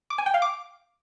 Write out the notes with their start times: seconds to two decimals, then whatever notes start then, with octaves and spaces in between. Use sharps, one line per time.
0.10 D6
0.18 G#5
0.26 G5
0.34 F5
0.42 D6